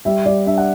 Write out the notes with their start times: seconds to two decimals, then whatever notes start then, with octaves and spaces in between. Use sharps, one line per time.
0.05 G3 E5
0.26 G3 D5
0.47 D4 E5
0.58 F#5